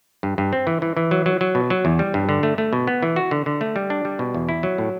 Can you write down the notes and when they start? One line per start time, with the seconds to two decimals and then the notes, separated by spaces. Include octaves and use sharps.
0.23 G2
0.38 G2
0.53 C4
0.67 E3
0.82 E3
0.97 E3
1.11 F#3
1.26 F#3
1.41 F#3
1.55 B2
1.70 F#3
1.85 E2
1.99 G3
2.14 G2
2.29 D3
2.43 A3
2.58 A3
2.73 B2
2.87 B3
3.03 E3
3.16 F#4
3.31 D3
3.46 D3
3.61 A3
3.76 G3
3.90 D4
4.05 G3
4.19 B2
4.35 E2
4.49 E4
4.63 F#3
4.78 A2